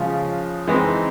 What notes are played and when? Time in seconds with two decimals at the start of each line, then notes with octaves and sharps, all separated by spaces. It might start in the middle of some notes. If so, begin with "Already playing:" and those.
Already playing: C#3 F3 G#3 C#4 F4
0.68 E3 G#3 C4 D#4